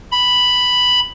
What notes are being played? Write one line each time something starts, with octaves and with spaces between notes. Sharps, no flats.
B5